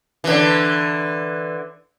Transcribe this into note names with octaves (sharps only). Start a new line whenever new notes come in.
D3 E3